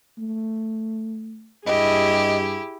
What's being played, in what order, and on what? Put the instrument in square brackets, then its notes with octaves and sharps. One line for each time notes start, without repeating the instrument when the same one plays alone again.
[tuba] A3
[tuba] G2 [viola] E4 G#4 [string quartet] G4 [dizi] D#5